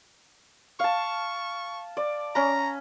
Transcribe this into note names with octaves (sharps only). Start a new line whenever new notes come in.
F5 A5 C#6
D5
C#4 A#5 B5